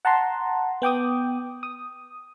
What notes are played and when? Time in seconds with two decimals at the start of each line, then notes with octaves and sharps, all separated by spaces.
0.05 F#5 A5 A#5 C6
0.82 B3 G5 D6 D#6
1.63 D#6